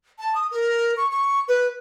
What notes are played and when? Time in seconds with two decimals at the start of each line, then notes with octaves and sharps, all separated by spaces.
0.19 A5
0.35 D#6
0.51 A#4
0.97 C#6
1.11 C#6
1.48 B4